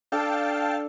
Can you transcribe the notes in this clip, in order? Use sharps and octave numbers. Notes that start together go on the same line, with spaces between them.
D4 A4 F5 G5 A5